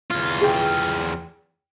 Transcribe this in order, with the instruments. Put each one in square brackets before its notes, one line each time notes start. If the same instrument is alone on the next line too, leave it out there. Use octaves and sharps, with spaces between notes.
[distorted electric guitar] E2 F4
[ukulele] G#4 G5